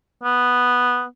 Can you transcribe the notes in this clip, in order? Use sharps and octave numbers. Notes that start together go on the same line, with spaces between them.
B3